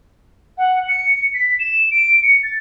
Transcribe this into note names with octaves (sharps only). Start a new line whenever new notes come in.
F#5
C#7
B6
E7
D7
C#7
A6